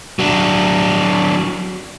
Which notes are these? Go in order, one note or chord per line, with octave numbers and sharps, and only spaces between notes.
F#3 D4